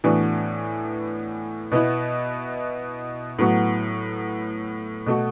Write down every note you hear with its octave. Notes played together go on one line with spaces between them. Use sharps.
A2 E3 B3 D4 F#4
B2 B3 E4
A2 F#3 B3 F#4
B2 A3 F#4